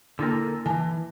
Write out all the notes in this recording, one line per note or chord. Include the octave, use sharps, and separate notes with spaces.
D3 A#3 D4 E4 A4 A#4
D#3 E3 G#5 A5